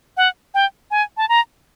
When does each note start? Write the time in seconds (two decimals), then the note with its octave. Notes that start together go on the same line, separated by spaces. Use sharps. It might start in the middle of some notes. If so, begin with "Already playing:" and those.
0.17 F#5
0.54 G5
0.91 G#5
1.17 A5
1.29 A#5